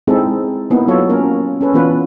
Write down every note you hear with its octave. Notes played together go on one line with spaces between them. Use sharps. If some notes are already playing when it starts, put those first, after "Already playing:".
G#3 C4 D#4 E4 G#4 A4
A#3 B3 D#4 E4
F#3 F4 A4 C#5
A#3 C#4 A#4
C#4 A4 B4
E3 B3 D4 F4 B4